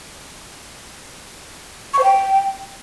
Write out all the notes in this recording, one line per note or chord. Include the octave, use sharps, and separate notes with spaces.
C#6
C5
G5